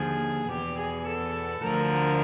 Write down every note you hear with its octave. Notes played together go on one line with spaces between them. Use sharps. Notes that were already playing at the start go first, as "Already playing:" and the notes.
Already playing: D#2 D3 F3 G#4
E2 B2 G4
G#4
A4
D2 D3 F3 A#4